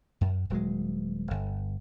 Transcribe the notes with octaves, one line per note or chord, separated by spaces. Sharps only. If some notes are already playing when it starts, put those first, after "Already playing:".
F#2
D#1 F#3 G#3
G1